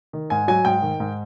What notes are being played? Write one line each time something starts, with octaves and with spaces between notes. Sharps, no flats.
D#3
G#2 G#5
F#3 G#5
G#2 G5
D#3
G#2